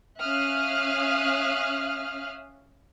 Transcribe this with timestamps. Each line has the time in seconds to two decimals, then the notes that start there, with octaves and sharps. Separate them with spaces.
0.20 C#4 E5 F5 D#6 F6 F#6